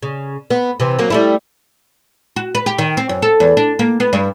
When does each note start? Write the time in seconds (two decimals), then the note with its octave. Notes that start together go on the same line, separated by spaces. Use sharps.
0.03 C#3
0.50 B3
0.80 C3 E3
0.99 F#3 A#3
1.10 G3 A3 E4
2.36 F#4
2.55 B4
2.66 G4
2.78 D#3
2.97 C4
3.09 F#2
3.22 A4
3.40 E2
3.57 D4
3.79 A#3
4.00 B3
4.13 G2